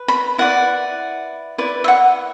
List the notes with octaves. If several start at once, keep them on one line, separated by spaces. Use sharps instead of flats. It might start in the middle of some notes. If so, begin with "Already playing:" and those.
Already playing: B4
B5
E4 B4 D5 F#5
E4 B4 D5
E5
F#5